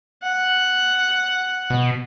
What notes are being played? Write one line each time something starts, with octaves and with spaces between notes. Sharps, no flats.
F#5
B2